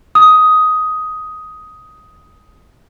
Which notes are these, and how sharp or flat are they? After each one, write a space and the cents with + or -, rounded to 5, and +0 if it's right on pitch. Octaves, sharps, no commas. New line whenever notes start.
D#6 +10